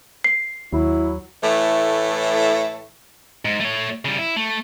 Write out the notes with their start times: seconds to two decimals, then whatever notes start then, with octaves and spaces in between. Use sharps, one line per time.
0.24 C7
0.73 D#2 F#3 E4
1.42 A2 E3 A3
3.45 G#2
3.60 A3 C#5
4.05 C#3 G3
4.18 E4
4.36 A3